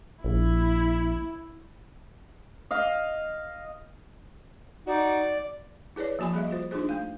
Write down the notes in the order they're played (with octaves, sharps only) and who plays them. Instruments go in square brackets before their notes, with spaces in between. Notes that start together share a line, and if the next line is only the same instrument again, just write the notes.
[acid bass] A#1 [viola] E4
[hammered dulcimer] D#5 F5
[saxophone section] D#4 F#4 [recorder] D5
[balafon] E4 G#4 B4 C#5 D5
F3 A#3 F#4 G#5 B5
G3 G#4 D#5 E5
F4 F#4 C5
D4 D#4 F4 G#4 C5
A3 F5